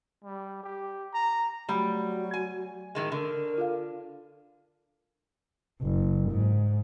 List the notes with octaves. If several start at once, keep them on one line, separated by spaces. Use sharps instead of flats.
G3
G4
A#5
F#3 G3 A3 A#5 B5
G#5
A2 D#3 G#3
D3 A#4
F4 A4 F5
F#1
G#2